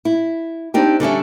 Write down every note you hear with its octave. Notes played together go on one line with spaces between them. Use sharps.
E4
C4 D4 D#4 G4
D3 G3 C#4 E5